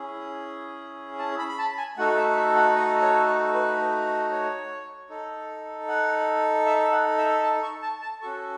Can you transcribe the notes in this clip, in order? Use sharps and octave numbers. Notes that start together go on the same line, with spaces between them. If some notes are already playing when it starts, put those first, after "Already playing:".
Already playing: C#4 E4 G#4
A5
B5
B5
A5
G#5
A3 D#4 F#4 A4 F#5
E5
E5
F#5
D#5
C#5
A4
B4
C#5
D#4 A4
F#5
E5
F#5
E5
A5
C#6
A5
A5
C#4 F#4 A4 C#6